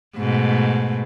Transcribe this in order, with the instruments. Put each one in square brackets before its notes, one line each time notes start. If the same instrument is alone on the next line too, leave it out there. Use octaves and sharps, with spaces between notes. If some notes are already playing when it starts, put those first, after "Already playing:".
[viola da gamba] G#2 B2 A3